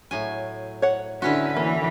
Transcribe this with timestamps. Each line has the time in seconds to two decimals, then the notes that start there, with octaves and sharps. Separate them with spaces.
0.11 A2 F#3 G#5
0.82 C#5 F#5
1.22 D3 C#4 E4 F#4 B4
1.57 E3 A#3